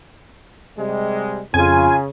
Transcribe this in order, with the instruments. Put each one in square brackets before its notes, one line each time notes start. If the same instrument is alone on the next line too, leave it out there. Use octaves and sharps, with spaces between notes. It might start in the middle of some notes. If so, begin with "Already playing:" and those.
[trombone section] C3 G3 G#3
[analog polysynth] F2 [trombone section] C#3 [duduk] F4 [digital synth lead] G#5